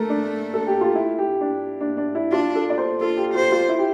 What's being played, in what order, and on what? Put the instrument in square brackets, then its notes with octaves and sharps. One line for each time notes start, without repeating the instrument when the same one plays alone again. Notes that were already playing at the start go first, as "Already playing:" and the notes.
Already playing: [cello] A3 [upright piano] A4 A#4
[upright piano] D4
A4
G4
F4
E4
G4
D4
D4
D4
E4
[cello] D4 [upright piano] F4
[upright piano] A4
D5
C5
[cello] F4 [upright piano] A4
[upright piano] G4
[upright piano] F4 [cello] C5
[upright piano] F4
E4
G4